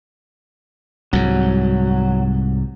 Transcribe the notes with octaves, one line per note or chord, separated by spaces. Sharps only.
C2 G#2 F#3